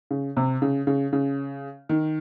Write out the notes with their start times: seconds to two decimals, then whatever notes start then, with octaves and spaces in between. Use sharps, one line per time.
0.11 C#3
0.37 C3
0.62 C#3
0.87 C#3
1.13 C#3
1.89 D#3